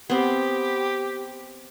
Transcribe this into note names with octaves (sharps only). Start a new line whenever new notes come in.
B3 C4 G4